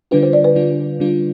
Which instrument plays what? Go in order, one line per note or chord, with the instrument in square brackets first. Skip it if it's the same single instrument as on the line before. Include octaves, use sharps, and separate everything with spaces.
[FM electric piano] D3 G3 D4 F4 [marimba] B4
[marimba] C5
D5
B4
[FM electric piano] D3 G3 D4 F4
D3 G3 D4 F4